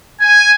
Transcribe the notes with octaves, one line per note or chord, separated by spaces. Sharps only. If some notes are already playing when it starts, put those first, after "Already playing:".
G#5